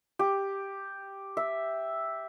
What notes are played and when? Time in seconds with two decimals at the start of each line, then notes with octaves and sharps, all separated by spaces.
0.19 G4
1.37 E5